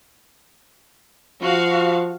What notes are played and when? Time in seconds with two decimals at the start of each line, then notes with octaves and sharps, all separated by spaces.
1.42 F3 F#4 F5